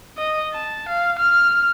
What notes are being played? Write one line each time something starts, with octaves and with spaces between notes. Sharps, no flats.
D#5
A5
F5
F6